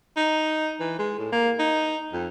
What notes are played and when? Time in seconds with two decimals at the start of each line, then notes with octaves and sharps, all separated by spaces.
0.17 D#4
0.80 E3
0.99 G#3
1.19 A2
1.32 A#3
1.59 D#4
2.13 F2